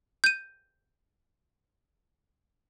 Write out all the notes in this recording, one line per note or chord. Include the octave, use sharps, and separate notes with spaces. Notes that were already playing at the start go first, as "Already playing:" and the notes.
G6 D#7